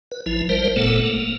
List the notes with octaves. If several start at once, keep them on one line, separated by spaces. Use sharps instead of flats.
B4
A1 F3 E4
A1 G3 A#4 C5
F#1 A#2 A3 B3 A4
A#3